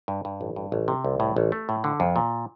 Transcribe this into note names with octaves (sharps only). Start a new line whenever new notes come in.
G2
G2
A1
G2
A1
C3
C2
A2
A1
A3
A2
D3
F2
A#2